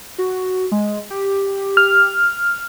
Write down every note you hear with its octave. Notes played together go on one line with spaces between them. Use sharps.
F#4
G#3
G4
F6